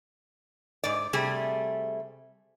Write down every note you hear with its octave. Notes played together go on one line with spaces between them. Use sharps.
G#2 D5
C3 G3 A3 G#4